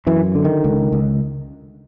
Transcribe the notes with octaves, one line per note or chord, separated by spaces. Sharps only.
F#2 E3
D3
D#3
C#2
C#2